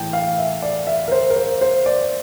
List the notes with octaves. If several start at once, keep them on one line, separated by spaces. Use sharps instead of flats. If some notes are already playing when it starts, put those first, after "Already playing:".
Already playing: A2 E3 G5 A5
F5
E5
D5
E5
A#4
C5
A#4
C5
C5
D5